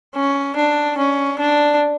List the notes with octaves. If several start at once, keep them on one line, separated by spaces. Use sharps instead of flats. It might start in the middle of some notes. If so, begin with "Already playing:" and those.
C#4
D4
C#4
D4